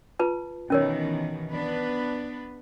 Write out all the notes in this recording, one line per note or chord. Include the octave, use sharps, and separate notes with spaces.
F4 B4 A5
B2 D#3 E3 C#4 A#4 C#5
B3 D4 B4